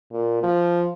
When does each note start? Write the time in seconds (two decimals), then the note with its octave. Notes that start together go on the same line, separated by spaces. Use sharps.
0.13 A#2
0.43 F3